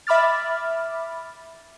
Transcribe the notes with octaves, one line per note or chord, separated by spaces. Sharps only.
E5 B5 D6 F6 A6